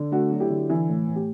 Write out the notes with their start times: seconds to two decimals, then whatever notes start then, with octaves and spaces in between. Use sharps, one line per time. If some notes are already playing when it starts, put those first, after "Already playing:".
Already playing: D3
0.12 A3 D4 F#4
0.31 F#3
0.40 E4 G4
0.50 D3
0.70 E3
0.89 A2
1.08 A2
1.16 G4